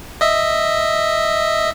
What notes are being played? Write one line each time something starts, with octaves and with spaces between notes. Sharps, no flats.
D#5 E5